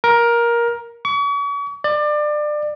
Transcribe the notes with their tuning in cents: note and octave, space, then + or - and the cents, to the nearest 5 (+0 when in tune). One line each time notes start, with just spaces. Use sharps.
A#4 +15
C#6 +40
D5 +25